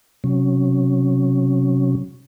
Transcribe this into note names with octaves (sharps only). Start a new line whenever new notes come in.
C3 F#3 C#4